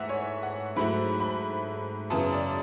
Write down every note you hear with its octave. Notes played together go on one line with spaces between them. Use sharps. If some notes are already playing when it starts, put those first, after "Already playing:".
Already playing: G#2 E3 A3 E5 F#5 G#5
C#5
F#5
G#2 F#3 A3 E4 B5
B5
F#2 C#3 E3 B3 E4 A5
D5